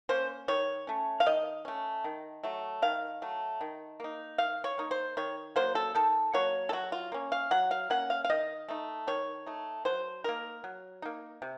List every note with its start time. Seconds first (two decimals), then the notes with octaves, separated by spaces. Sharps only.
0.09 A#3 C#4 C5
0.48 D#3 C#5
0.87 A3 C#4
1.20 F5
1.26 D#3 D#5
1.65 A3 C#4
2.04 D#3
2.43 F#3 A3
2.82 D#3 F5
3.22 F#3 A3
3.61 D#3
4.00 A#3 D#4
4.38 D#3 F5
4.64 C#5
4.78 A#3 D#4
4.91 C5
5.17 D#3 C#5
5.56 F#3 A#3 C5
5.75 A4
5.95 D#3 A4
6.33 F#3 A#3 C#5
6.69 A4
6.73 F#3 F#4
6.92 F4
7.12 A#3 C#4
7.32 F5
7.51 F#3 F#5
7.71 F5
7.90 A#3 C#4 F#5
8.10 F5
8.25 F5
8.30 D#3 D#5
8.69 A3 D#4
9.07 D#3 C#5
9.46 A3 D#4
9.85 F#3 C5
10.24 A#3 D#4 A#4
10.64 F#3
11.02 A#3 D#4
11.42 C3